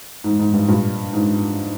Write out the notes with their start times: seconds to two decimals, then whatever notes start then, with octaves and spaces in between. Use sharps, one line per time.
0.24 G#2
0.39 G#2
0.53 G2
0.68 G2 A#2
1.13 G#2